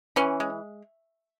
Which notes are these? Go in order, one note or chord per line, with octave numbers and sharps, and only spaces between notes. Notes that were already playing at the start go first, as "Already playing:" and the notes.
E3 C#4
G#3